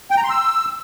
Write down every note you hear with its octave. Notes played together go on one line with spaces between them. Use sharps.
G5
A#5
C6
E6